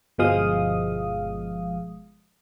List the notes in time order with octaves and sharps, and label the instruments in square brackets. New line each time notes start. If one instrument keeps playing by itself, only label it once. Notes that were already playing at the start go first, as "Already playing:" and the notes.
[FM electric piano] G1 B2 F3 G#3 F5 D#6